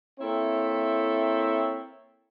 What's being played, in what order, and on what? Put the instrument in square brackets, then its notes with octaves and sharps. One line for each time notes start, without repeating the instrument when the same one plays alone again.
[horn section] A#3 C4 E4 A4 C#5 E5